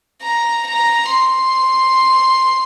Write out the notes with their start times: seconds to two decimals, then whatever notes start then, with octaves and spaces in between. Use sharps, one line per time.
0.22 A#5
0.68 A#5
1.14 C6